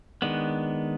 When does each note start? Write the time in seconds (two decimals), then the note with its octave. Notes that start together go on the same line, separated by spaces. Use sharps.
0.22 D#3 G#3 B3 D4